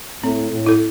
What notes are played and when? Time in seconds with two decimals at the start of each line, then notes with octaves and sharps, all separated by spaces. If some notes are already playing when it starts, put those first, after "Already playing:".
0.24 A2 C4
0.52 A2
0.66 E4 A4